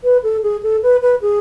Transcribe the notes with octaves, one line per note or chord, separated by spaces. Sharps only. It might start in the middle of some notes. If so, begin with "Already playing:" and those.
B4
A4
G#4
A4
B4
B4
G#4